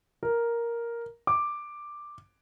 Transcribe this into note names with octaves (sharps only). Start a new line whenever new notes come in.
A#4
D6